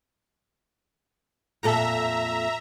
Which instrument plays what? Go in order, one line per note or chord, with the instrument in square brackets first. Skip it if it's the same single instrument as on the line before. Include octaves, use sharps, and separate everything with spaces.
[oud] F2 A#2 A4 [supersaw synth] E5 A#5